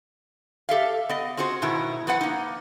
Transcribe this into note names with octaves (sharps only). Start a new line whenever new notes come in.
G4 A4 E5 F5
B3 D#5
C4 F4 F#4 G#4 C5
G#2 B2 D#3 E4
F3 B3 B4 F#5
A#3 D#4